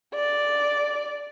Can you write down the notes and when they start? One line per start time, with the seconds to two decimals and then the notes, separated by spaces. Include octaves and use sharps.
0.15 D5